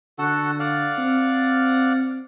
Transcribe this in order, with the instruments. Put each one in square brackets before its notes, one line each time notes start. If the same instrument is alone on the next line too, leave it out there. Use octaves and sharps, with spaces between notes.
[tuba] D3 [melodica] F#4 A4 F#5
[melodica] D5 F5 F#5
[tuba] C4